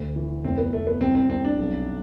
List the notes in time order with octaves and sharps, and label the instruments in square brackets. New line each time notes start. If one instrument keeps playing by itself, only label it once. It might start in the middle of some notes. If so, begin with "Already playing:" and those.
Already playing: [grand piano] D2
E3
[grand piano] F1 [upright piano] C4
[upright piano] B3
[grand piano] F1 [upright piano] A3
[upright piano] B3
[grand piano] C2 [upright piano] C4
[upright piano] C4
[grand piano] C2 [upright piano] C4
[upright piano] D4
[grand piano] B1